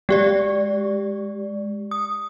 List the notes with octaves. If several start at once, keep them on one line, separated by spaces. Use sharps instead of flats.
G#3 G4 D5
D#6